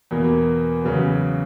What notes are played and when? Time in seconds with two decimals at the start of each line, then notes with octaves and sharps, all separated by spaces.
0.11 E2 B2 A#3
0.84 E2 C#3 F#3 B3